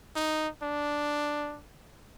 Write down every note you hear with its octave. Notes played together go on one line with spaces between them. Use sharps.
D#4
D4